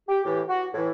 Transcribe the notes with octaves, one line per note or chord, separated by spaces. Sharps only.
G4
A2 E3 G4
F#4
A2 E3 E4